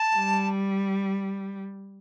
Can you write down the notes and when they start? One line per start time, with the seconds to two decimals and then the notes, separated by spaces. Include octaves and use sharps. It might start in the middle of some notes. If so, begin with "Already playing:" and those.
Already playing: A5
0.16 G3